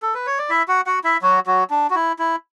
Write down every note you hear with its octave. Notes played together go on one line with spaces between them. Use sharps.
A4
B4
C#5
D5
E4 E5
F#4 F#5
F#4 F#5
E4 E5
F#3 F#4
F#3 F#4
D4
F#4
E4
E4